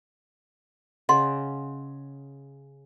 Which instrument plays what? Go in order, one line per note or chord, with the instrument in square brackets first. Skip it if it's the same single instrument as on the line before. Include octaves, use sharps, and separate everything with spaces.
[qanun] C#3 [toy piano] D#5 F#5 C6